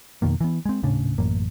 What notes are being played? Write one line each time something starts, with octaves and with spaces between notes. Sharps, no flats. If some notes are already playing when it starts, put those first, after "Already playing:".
F2 B2 D#3 A#3
E3 B3
G#3 C4
D#1 A2 C#3 D4
A1 F#2 A#3